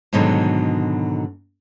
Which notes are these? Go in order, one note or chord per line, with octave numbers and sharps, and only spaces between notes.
G#2 B2 D3 D#3 F#3